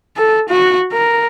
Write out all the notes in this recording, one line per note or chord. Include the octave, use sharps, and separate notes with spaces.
A4
F#4
A#4